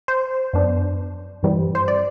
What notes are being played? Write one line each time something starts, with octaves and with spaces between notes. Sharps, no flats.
C5
F#2 F#3 B3 D4
G2 E3 G3 C4
C5
D5